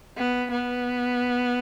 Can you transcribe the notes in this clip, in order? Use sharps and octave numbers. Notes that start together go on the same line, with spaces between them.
B3
B3